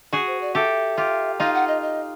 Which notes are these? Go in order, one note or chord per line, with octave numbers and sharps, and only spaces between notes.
F#4 G#4
C5
D5
G4 A4 E5
F4 G4
D#4 F4 F5
F#5
D#5
D#5